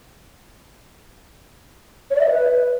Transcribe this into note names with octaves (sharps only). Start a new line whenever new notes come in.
C#5
D5
E5
D#5
B4